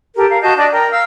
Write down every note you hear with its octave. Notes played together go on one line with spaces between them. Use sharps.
G4 A4 A#4
A#4 F5
F#4 D#5 A5 G6
D4 D5 D#5
A#4 G5 A#5
F5 E6